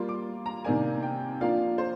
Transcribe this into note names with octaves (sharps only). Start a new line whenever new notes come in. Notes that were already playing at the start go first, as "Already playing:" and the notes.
Already playing: G3 A#3 F4 C6
D6
A#5
C3 D#3 A#3 D4 G#5
G5
F3 A#3 D4 F4 F5
C5